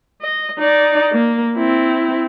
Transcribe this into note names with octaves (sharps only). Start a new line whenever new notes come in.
D#5
D#4 D5
A#3
C4 E4